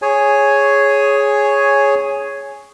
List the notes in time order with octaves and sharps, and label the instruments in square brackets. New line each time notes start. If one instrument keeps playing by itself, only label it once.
[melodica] G#4 C#5 G#5